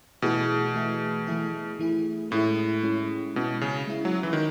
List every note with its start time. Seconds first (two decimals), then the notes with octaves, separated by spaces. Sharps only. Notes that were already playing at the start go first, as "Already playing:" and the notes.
0.22 B2 E3 A3 E4 G#4
0.75 E3 A3 E4 G#4
1.27 E3 A3 E4 G#4
1.79 E3 A3 E4 G#4
2.31 A2 G#3 C#4 E4
2.83 G#3 C#4 E4
3.36 B2 G#3 C#4 E4
3.61 C#3
3.87 G#3 C#4 E4
4.05 F#3
4.23 E3
4.33 D#3